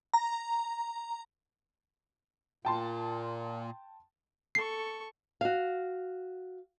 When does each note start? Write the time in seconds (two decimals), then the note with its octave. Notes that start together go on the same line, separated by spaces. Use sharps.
0.14 A#5
2.65 A#2 G5 A5 C6
4.55 A4 C#6 C7
5.41 F#4 F5